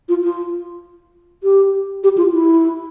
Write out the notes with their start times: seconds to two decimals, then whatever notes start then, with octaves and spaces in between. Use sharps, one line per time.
0.09 F4
0.24 F4
1.44 G4
2.04 G4
2.17 F4
2.33 E4